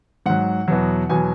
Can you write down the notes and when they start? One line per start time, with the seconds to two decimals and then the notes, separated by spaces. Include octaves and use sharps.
0.26 G#2 F#3 F#5
0.68 E2 B2 F#3
1.09 E2 B2 F#3 G#5